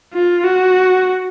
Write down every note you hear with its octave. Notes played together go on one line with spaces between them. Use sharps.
F4
F#4